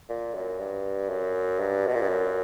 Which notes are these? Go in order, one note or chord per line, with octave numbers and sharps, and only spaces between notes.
A#2
F#2
G2
F#2
G2
B2
A#2
G2
F#2